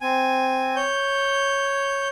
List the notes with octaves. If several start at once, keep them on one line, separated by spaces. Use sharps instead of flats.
C4 G#5
C#5 G6